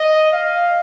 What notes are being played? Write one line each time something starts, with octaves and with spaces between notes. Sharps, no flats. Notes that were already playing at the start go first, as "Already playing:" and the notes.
Already playing: D#5
F5